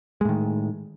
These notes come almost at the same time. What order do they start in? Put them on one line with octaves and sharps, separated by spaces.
G#3 A2 D#3